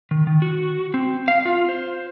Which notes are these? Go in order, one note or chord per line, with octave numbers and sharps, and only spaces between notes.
D#3
D#3
F#4
C4
F5
F4
C5